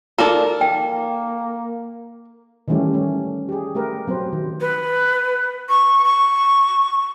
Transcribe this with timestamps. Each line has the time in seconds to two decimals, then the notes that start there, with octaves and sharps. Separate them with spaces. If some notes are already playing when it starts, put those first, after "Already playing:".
0.18 D#4 F4 A4 A#4 D5 A#5
0.61 A#3 G5
2.68 D#3 E3 G3 A3 C#4 G4
2.94 A3 C#4
3.49 G4 G#4
3.75 A3 G4 A#4 B4
4.07 F#3 C4 B4 C5
4.32 D#3
4.60 B4
5.69 C#6
6.04 C#6